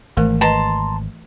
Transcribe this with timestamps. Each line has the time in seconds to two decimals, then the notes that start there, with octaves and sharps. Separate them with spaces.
0.17 G#1 E3 A3 A#4
0.41 B4 D#5 A5 A#5 C6